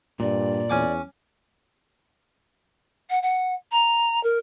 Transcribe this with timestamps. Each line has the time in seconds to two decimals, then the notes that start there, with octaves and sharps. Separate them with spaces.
0.20 G2 A#2 D5
0.70 E2 C#4 G#5 D6
3.10 F#5
3.22 F#5
3.71 A#5
4.23 A#4